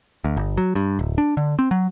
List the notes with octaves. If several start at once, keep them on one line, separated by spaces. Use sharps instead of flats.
D2
G1
F#3
G2
D1
D4
D3
C4
F#3